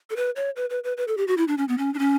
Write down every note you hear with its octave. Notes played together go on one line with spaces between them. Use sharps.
A4
B4
C#5
B4
B4
B4
B4
A4
G4
F#4
E4
D4
C#4
B3
C#4
D4
C#4